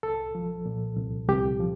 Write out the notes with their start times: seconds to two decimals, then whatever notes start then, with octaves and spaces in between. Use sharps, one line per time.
0.03 C2 A4
0.35 F3
0.66 A#2
0.97 C2
1.29 C2 G4
1.60 F3